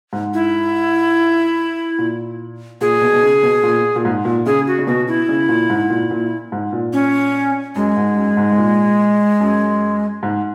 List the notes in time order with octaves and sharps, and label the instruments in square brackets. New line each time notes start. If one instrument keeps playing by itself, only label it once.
[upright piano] G#2
[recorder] E4
[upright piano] A#2
[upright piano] A#2 [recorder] G#4
[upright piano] B2
B2
C#3
B2
A#2
A#2
G#2
A#2
[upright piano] C#3 [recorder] G#4
[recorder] F#4
[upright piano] C#3
[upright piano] B2 [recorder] F#4
[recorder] E4
[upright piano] C#3
A#2
G#2
A#2
A#2
G#2
A#2
[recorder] C#4
[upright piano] F#2 [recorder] G#3
[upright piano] G#2
F#2
G#2
G#2
A#2
F#2
G#2